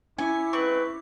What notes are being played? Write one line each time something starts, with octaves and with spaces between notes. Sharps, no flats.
C#4 E4 G#5 D6
G#2 C4 B4 C#6